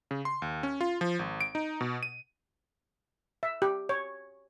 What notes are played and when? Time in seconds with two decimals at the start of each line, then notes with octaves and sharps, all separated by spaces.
0.11 C#3
0.25 C6
0.42 D#2
0.63 C#4
0.81 F4
1.01 F3
1.19 G#1
1.41 D7
1.55 D#4
1.81 B2
2.03 D#7
3.43 E5
3.62 G4
3.89 C#5